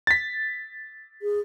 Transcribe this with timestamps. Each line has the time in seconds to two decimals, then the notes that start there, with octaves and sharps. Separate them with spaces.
0.07 A6 B6
1.22 G#4